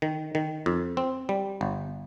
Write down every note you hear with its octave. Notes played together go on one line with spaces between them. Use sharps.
D#3
D#3
F2
C4
G3
G1